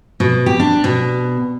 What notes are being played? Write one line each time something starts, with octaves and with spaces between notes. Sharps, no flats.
B2
G4
D4
B2